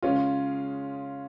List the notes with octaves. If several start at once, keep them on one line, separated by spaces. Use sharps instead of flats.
C#3 G#3 C#4 F4